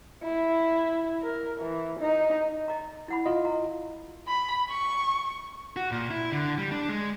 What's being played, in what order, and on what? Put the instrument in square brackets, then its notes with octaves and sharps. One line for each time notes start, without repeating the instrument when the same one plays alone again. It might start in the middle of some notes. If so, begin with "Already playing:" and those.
[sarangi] E4
A#4
E3
D#4
[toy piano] D#5 A#5
E4 F#5 B5
[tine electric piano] F4 D#5
[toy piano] A#5
[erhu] B5
C#6
[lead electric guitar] F#4
A#2
E4
D3
G3
D4
G#3